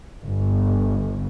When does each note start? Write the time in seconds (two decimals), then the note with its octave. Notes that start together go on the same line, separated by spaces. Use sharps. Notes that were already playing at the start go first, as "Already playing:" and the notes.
0.24 G1